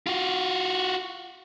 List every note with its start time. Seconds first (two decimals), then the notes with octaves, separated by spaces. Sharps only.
0.07 F4 F#4